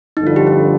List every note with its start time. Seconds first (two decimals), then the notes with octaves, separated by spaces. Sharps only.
0.17 G1 F2 D3 D#4
0.27 F4
0.36 G4
0.47 F4